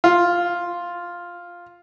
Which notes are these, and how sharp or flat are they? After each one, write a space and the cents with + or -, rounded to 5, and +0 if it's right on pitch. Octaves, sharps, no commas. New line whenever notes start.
F4 +0